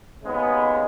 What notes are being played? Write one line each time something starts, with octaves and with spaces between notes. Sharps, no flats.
D#2 C#3 G#3 B3